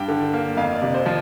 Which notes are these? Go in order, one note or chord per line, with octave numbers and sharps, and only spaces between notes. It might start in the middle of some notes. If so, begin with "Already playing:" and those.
Already playing: G2 G5
D3
A#3
F2 F5
D5
C3
C5
F3